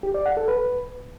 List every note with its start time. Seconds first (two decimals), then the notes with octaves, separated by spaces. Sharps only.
0.03 G4
0.14 D5
0.26 F#5
0.37 A4
0.48 B4